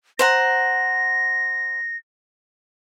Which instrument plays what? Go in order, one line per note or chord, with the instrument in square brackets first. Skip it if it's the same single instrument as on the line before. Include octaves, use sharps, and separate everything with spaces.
[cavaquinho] C5 F#5 A#5 [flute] A#6